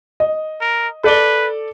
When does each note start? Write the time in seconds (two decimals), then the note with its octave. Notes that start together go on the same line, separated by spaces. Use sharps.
0.20 D#5
0.61 A#4
1.04 A4 B4 D5 G7